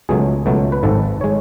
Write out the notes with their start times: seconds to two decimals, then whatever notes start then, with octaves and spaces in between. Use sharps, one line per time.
0.09 C#2 B2 F#3 A3 G#4
0.46 C#2 B2 F#3 A3
0.72 B4
0.83 G#1 G#2 G#3 A4
1.21 G#3 C#5